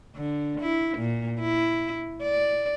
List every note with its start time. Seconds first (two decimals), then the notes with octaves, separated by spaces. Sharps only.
0.16 D3
0.61 E4
0.98 A#2
1.39 E4
2.22 D5